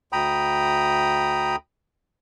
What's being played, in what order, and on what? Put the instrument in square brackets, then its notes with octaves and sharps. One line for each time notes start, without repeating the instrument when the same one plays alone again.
[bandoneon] D2 G5 A#5 B5 D#6